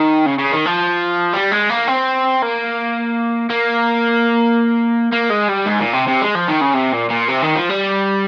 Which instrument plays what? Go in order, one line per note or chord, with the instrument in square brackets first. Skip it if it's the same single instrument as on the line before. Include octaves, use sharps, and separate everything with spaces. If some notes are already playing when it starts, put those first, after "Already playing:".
Already playing: [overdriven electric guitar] D#3
C#3
C#3
D#3
F3
G3
G#3
A#3
C4
A#3
A#3
A#3
G#3
G3
G#2
A#2
C3
C3
G#3
F3
D#3
C#3
C3
A#2
A#2
C3
D#3
F3
G3